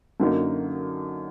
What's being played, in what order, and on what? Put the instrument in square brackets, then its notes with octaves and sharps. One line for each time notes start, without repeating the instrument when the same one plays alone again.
[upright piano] F#2 D3 F#3 A#3 D#4